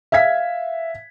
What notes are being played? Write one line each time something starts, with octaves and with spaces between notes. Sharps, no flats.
E5 F5 G#6 B6